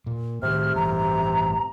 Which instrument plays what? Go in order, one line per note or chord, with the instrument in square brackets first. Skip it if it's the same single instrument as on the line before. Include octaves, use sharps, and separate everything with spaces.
[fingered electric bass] A#2
[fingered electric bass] A2 D#3 [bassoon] C3 [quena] F6
[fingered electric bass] A1 G2 E3 [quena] A#5